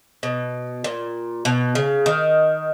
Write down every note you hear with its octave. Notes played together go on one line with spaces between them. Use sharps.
B2
A#2
B2
C#3
D#3